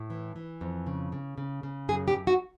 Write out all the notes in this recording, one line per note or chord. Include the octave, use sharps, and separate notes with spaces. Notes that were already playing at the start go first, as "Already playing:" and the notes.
Already playing: A2
E3
E3
F2
C#3
C#3
C#3
C#3
F#2 G#4
G4
F#2
F#4